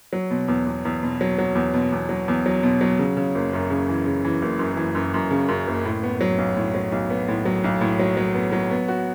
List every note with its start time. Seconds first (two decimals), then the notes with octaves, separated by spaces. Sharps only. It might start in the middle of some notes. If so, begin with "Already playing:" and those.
0.13 F#3
0.30 B2
0.48 E2
0.66 E2
0.85 E2
1.03 B2
1.21 F#3
1.38 F#3
1.55 E2
1.74 B2
1.92 E2
2.09 F#3
2.28 E2
2.46 F#3
2.63 B2
2.81 F#3
2.98 C#3
3.17 C#3
3.35 F#1
3.53 F#2
3.70 C#3
3.89 E3
4.06 C#3
4.25 E3
4.42 F#1
4.59 F#2
4.77 E3
4.95 F#2
5.14 F#2
5.31 C#3
5.48 F#2
5.67 F#1
5.85 A2
6.03 B3
6.21 F#3
6.38 B1
6.57 A2
6.75 F#3
6.92 B1
7.10 B3
7.28 A2
7.45 F#3
7.64 B1
7.81 A2
7.99 F#3
8.17 F#3
8.35 B3
8.52 F#3
8.71 B3
8.88 F#4